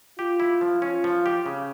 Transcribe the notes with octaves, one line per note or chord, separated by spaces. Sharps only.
F4 G4
E4
F3
C#4 F4
F3
G4
C#3